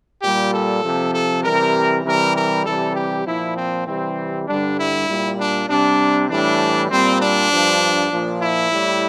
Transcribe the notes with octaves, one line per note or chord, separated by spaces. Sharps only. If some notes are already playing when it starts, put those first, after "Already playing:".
A#2 G3 G4
A4
C3 F3
A4
C3 E3 G3 A#4
C3 E3 G3 A#4
A#4
C3 E3 G3 A4
G4
A#2 F3 E4
C4
C3 E3 G3 C4
G2 D3 G3 D4
E4
A#2 G3
D4
C3 G3 D4
A2 E3 G3 D4
A#2 G3 C4
D4
G2 F3
A#2 F3
E4
A2 G3